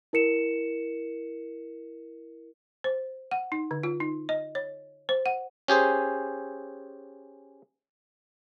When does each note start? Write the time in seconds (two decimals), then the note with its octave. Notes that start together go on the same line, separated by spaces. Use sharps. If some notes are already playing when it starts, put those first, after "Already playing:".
0.13 E4 A#4 C#7 E7
2.84 C5
3.31 F#5
3.52 D#4
3.71 D3
3.83 F4
4.00 D#4
4.29 D#5
4.55 C#5
5.09 C5
5.26 F#5
5.68 C#4 G4 G#4 C5